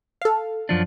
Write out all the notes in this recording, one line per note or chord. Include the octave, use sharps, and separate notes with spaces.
A4 F5
F#2 F3 D4